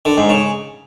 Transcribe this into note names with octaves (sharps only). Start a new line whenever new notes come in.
D3
G#2
C#3